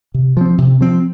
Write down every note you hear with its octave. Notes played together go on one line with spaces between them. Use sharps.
C3
F3 C4
C3
F3 C4